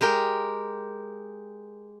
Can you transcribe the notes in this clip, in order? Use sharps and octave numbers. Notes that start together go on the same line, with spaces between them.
G#3 G4 A#4 G5